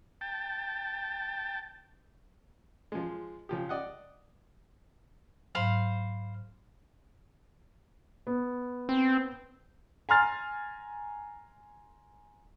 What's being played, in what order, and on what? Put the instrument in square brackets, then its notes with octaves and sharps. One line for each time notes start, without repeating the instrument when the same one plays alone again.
[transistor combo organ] G5 A5
[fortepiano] F3 G#3
C#3 F3 G4
D5 D#5 F#5
[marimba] G#2 F#3 [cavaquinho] C5 F5 B5
[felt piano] B3
[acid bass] C4
[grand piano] G#5 A#5 C6 F6 A6